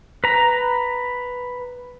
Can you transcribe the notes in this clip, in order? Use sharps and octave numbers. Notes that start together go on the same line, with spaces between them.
B4 A#5